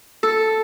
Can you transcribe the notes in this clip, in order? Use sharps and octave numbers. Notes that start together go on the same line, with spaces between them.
A4